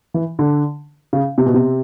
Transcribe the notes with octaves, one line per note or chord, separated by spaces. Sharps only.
E3
D3
C#3
C3
B2
C3